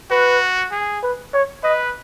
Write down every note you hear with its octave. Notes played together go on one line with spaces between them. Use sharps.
F#4 B4
G#4
B4
C#5
B4 D#5